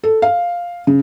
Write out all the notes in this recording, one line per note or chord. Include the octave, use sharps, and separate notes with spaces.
A4
F5
C#3